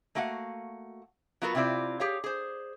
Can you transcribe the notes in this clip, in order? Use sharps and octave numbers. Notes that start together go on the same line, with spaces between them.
A3 A#3 F#4 F5 F#5
F#3 B3 F4 F#4 A#4 B4
C3 C4 E4 F4 D5
G4 G#4 C#5 F5
G#4 C5